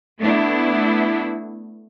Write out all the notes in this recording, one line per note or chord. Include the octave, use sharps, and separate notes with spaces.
A3 B3 D4 E4